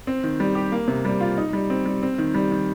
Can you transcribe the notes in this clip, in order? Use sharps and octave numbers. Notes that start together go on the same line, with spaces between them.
C4
D#3
G3
G4
A#3
C3
G3
F4
D#4
G3
C4
G3
C4
D#3
G3
D#3